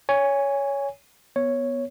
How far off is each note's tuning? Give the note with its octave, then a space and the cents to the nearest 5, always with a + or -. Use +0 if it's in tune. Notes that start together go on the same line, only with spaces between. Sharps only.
C#5 +15 G#5 -15
B3 +0 C#5 +0